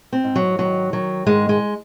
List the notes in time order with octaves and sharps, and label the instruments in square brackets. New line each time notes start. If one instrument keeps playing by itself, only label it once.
[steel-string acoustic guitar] C4
G#2
F#3
D#3 F#3
D#3 F#3
G#2 G#3
G#3